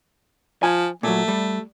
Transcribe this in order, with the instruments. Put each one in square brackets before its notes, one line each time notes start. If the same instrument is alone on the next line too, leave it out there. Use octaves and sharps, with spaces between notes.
[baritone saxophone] F3 [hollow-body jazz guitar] G#5
[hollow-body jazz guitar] A#2 F#3 [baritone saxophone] A3
[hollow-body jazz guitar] G3